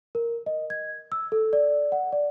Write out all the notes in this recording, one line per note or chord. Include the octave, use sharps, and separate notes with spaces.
A#4
D#5
G#6
E6
A4
D5
F#5
D5